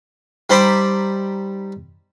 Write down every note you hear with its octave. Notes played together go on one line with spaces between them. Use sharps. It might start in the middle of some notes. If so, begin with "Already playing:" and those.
G3 D#4 C5 A5 B5 D6